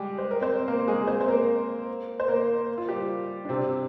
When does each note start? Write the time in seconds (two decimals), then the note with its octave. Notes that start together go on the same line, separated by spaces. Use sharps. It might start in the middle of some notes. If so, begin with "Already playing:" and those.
Already playing: G3 G#3 G4 G#4
0.18 C5
0.31 A#4
0.41 C4 C5
0.68 A#3 A#4
0.88 G#3 G#4
1.07 C4 C5
1.21 C5
1.28 A#3 A#4
2.20 C5
2.28 A#3 A#4
2.78 F4
2.89 G3 G4
3.45 D4
3.49 C3 C4